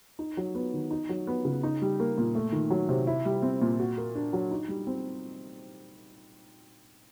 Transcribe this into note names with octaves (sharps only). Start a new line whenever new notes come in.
D#4
F#3
B3
D#3
D#4
F#3
B3
C#3
D#4
G3
A#3
A#2
A3
D#3
F#3
C3
E4
G3
C4
A#2
F#4
A#3
D4
F#3
D#4
G3
C4